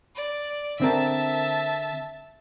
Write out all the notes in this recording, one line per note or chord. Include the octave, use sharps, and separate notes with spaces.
D5
D3 C4 A#4 E5 A5